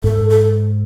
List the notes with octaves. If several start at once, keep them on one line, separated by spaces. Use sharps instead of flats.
G#2 A4
A4